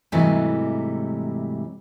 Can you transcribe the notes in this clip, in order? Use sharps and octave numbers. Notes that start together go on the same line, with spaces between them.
G#2 C3 E3 F#3 G3 A3